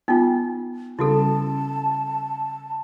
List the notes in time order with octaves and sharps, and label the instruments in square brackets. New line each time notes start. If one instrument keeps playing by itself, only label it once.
[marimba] B3 G5 G#5 [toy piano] D#4 F4
[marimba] C#3 G3 C#4 [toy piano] E4 F#4 A4 [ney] A5